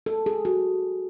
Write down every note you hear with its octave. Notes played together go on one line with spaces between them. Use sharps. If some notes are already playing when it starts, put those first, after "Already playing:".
A4
G#4
F#4